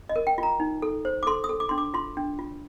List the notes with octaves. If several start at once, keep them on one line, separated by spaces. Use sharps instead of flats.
D#5
A#4
G5
F4 A#5
D#4
A4
C5
D6
A4 C6
D#6
A4
D6
D4 C6
D6
F4 C6
D4
F4